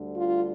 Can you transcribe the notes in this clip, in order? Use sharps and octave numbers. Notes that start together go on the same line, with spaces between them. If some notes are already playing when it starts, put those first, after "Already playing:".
Already playing: D2 D3 G3
F4